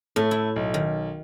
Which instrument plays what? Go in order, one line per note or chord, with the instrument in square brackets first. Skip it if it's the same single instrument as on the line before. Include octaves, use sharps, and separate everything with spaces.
[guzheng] A2 [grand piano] A3
[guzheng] E4
[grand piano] B1
[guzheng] D#3